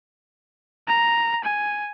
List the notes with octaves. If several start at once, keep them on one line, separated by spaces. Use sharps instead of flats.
A#5
G#5